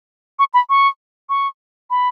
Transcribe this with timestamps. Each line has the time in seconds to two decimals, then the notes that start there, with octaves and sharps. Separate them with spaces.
0.39 C#6
0.54 B5
0.70 C#6
1.29 C#6
1.90 B5